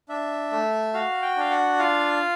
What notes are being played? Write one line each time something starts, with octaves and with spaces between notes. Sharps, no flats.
D4 E5
A3
F#4 F5
G5
D4 F5
F#5
F4 F5